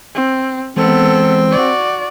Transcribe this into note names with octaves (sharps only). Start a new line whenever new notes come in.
C4
E3 G#3 B3 C4 A4
F#4 D5